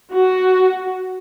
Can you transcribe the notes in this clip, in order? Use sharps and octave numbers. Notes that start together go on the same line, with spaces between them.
F#4